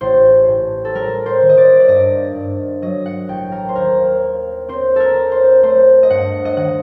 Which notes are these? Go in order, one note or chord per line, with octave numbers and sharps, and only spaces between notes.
A1 C5
A2
A4
G3 A#4
C5
D#3
D#5
D5
D5
G2 D#5
G2
F#3 D#5
F#5
A1 G5
A#4
C5
D#2 A#4
A#3
C4 C5
A4 A#4
C4
C5
A3 C5
D#5
G2 F#5
D#5
D#3 F#5